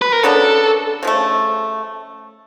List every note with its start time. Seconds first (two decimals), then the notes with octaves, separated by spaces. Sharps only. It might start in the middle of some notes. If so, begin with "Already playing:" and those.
0.02 B4
0.12 A#4
0.23 C#3 F#3 B3 D4 A4
1.03 C#3 F3 A3